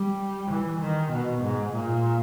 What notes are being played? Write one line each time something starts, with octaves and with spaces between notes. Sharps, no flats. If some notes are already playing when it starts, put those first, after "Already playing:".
Already playing: G3
E3
D#3
B2
G#2
A#2